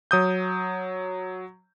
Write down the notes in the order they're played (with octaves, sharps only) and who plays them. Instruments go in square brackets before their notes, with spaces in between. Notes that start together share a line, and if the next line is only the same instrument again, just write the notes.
[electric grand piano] F#3 D#6 G6